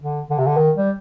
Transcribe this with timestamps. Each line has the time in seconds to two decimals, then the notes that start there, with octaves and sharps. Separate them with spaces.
0.02 D3
0.30 D3
0.38 C3
0.46 D3
0.57 D#3
0.77 G3